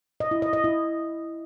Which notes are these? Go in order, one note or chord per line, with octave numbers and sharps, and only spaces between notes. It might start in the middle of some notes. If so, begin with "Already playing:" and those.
D#5
E4
D#5
D#5
E4